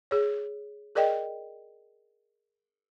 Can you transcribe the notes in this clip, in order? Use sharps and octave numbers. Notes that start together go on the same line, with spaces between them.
G#4 C#5
G#4 A#4 D5 D#5 G5